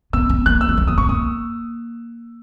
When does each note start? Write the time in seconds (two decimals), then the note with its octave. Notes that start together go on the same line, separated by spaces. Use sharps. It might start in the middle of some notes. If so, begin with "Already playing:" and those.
0.13 B3 E6
0.29 B3
0.46 A#3 F#6
0.61 E6
0.69 A#3
0.77 G#3
0.87 A#3 D#6
0.98 B3 C#6
1.09 A#3 D#6